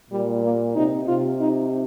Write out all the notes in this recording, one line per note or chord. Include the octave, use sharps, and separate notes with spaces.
A#2 G3
A#3
C3 D#4
C3 F4
D#4